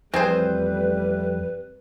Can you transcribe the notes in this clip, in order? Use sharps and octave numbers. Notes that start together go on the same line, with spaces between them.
A1 F2 G3 C4 G#4 B4 C5